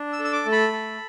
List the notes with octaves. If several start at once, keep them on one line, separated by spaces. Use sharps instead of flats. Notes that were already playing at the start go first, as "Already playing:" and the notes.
Already playing: D4
E6
A4
E6
D6
A3
B5
A4